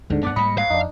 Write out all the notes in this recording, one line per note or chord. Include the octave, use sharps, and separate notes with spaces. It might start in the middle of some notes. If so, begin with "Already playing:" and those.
D2 G#2 D3
F#2 B3 D4 D5 F#5
G#2 G3 A#3 D#5 B5 C#7
B2 F#3 F#4 F5
F2 D4 D#4